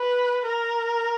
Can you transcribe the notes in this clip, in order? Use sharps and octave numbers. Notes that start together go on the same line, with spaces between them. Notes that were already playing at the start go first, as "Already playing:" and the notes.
Already playing: B4
A#4